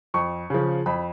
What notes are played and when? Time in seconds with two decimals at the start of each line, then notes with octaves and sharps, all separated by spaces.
0.14 F2 C#6
0.50 C#3 F3
0.86 F2 B5